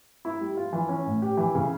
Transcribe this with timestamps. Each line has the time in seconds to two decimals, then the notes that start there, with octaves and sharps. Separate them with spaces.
0.25 E4
0.41 G3
0.57 F4
0.73 E3
0.89 C#4
1.06 A2
1.22 G4
1.37 E3
1.55 C#3